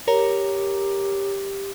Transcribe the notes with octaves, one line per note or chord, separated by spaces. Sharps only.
G4 A#4 C#5 A#5